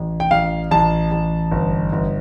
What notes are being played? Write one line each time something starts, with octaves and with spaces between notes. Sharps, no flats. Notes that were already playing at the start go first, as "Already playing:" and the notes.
Already playing: A1
G5
A1 F5
A1 A5
A1
G1
G1